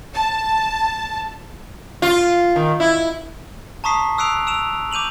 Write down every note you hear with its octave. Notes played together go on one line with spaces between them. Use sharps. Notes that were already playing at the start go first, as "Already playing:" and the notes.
A5
F4
D#3
E4
A5 A#5 C#6 D#6 B6 C7
D#6 E6 F#6 C7 D7 F7
E6 D7 E7 F7
D6 G6 D#7 F7 F#7